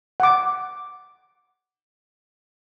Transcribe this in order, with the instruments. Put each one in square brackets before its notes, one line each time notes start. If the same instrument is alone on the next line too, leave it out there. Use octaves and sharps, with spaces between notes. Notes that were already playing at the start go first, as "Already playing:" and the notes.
[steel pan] F#5 D6